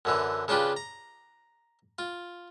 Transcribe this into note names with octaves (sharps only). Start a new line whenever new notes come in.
F#2 D3 E3
C#3 D4 F4 G4 B4
A#5
F4